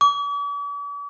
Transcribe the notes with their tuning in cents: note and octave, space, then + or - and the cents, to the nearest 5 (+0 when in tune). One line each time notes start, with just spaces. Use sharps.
D6 -45